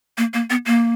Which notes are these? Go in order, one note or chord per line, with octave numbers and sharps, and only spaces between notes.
A#3
A#3
B3
A#3